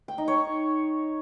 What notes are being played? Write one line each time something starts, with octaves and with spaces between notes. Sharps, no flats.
G5
D#4
C#5